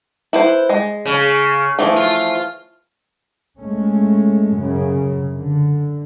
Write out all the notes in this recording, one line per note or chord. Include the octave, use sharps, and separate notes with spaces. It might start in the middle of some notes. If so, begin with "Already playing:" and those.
E4 B4 C5
G#3
C#3
E3 F3 A3
F4
G#3 A3 C#4
F#2 C#3
D3